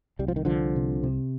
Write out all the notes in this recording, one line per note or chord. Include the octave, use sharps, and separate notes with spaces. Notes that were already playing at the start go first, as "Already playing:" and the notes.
C2 G3
F3
D#3
C2 D3 F3
C3
C3